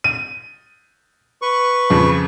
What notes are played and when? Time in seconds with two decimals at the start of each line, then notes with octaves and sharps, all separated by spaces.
0.04 D#7
1.42 B4 C#6
1.90 F2 C#3